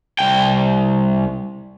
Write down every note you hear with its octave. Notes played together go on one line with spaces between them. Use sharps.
C2 G5